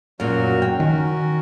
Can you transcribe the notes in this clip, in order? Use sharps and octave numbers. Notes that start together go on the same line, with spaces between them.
F#2 A#2 F#3 F#4 F6
G5
D#3 C#4 F#4 A#4